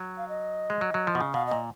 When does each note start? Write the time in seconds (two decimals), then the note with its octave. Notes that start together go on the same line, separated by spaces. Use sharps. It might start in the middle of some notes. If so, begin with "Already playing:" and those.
Already playing: F#3
0.17 F5
0.29 D#5
0.70 G#3
0.81 F#3
0.94 F#3
1.07 F3
1.15 B2
1.21 C#3
1.33 B2 F5
1.46 A#2 D#5